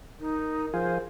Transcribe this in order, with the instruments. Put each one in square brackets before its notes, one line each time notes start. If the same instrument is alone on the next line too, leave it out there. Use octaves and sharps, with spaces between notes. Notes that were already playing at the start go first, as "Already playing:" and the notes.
[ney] D#4 [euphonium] A#4
[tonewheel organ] F3 F4 G#4 [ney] C5